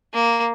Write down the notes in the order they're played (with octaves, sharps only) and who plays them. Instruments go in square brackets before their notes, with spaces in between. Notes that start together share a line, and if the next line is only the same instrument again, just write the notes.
[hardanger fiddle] A#3